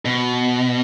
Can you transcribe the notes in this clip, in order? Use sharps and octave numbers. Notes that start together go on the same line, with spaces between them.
B2